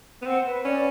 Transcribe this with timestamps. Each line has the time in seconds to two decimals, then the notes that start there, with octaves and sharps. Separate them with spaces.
0.22 B3
0.26 C4 F#5
0.46 B4
0.65 C#4 D5